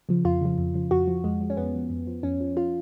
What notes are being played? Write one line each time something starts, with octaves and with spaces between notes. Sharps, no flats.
C#3 F3
F2 F4
C#3 F3
F2
C#3 F3
F2 F#4
F3
F2 G#3
F3
C#4
F2 B3
F3
F2
F3
F2 C#4
F3
F4